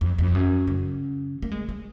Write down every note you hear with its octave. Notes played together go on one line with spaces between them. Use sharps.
F2
F2
F#2
C#3
A#3
G#3
G#3